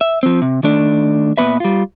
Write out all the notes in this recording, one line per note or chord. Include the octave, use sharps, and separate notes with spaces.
E5
F3 C4
C3
D#3 A3 D4
A#2 G#3 B3 B4 E5
G3 F4